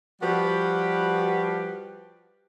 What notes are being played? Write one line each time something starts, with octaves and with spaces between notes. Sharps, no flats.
F3 G3 F#4 G4 B4